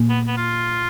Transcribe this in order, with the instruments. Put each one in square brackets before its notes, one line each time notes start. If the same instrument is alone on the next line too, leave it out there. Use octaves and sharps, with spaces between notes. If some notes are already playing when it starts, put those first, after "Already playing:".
Already playing: [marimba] A#2 A#3
[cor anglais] B3
B3
F4